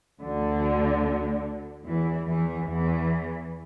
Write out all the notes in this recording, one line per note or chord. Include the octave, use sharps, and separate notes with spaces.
D2 D3
E2 E3
E2 E3
E2 E3